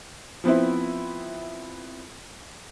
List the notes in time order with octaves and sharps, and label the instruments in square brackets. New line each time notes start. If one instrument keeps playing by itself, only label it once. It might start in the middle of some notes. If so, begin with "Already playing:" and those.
[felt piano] F3 B3 C4 E4